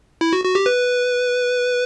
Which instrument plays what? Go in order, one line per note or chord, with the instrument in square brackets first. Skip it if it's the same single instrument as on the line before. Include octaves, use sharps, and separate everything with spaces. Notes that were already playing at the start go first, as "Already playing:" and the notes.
[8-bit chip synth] E4
F#4
F#4
G4
B4